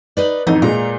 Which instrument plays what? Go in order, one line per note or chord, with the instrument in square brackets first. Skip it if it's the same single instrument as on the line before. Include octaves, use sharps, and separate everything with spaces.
[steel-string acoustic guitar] D#4 B4 D5
[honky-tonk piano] A1 F2 [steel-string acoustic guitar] D#4
[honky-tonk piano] A#2 G#3 [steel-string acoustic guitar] A#5